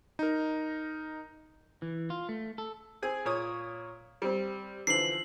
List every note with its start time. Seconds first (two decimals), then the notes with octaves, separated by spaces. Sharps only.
0.19 D#4 A#4
1.82 E3
2.10 F4
2.29 A3
2.58 A4
3.02 C4 G#4 G#5
3.25 A#2 C#5 D#6
4.22 G3 C4
4.87 D3 E3 F3 C7 F#7